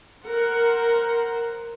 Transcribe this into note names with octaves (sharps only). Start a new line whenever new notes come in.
A#4 C5 F#5